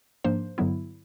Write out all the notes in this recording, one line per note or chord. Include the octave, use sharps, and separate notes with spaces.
G#2 F3 A#3 D4 C5
G2 D3 F#3 B3 E4